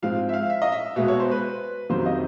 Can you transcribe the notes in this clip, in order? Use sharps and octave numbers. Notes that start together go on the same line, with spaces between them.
G#2 F3 G#3 C4 F5
E5
F5
E5
D#5
E5
B2 G#3 B3 E5
C#5
C5
B4
F2 C3 D#3 F#3 C5
D#5